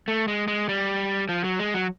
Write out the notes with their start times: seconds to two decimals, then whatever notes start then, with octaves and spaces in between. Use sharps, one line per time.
0.08 A3
0.28 G#3
0.48 G#3
0.69 G3
1.29 F3
1.44 F#3
1.59 G#3
1.74 F#3